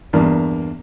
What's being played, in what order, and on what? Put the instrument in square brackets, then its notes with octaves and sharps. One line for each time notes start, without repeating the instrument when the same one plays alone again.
[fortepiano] E2 G2 A#3